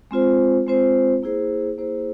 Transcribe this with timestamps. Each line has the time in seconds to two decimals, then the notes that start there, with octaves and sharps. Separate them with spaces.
0.11 G#3 C4 F4 C5
0.67 G#3 C4 F4 C5
1.23 A#3 E4 G#4 C5
1.78 A#3 E4 G#4 C5